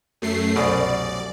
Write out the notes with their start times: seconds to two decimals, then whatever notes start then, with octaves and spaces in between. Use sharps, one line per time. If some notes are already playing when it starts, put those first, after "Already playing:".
0.22 F#2 A3 C7
0.56 C2 F#2 B2 D5